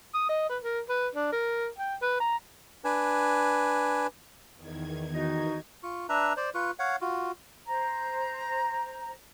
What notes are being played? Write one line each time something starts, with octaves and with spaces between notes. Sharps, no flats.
D#6
D#5
B4
A#4
B4
D4
A#4
G5
B4
A#5
D4 B4 G#5
E2 D#3 G#6
D#4 F#4
F4 C#6
D4 B4 E5 A#5
C5 D5
F4 B4 C#6
C#5 F5 F#5
F4 F#4
C5 A#5